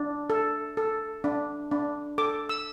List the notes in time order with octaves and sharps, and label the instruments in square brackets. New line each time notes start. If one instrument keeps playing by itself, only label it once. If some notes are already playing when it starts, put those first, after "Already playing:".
Already playing: [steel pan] D4
A4
A4
D4
D4
A4 D6
E6